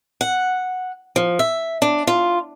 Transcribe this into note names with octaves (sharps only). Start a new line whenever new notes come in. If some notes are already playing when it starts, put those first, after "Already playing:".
F#5
F3
E5
D4
F4